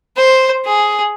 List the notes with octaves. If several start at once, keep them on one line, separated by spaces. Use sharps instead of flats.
C5
G#4